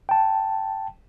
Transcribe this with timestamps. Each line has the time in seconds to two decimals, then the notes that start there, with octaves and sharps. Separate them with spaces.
0.09 G5 A5